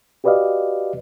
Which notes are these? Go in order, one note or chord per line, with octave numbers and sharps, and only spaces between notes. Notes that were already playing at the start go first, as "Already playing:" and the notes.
F#4 G4 B4 D5 D#5 F5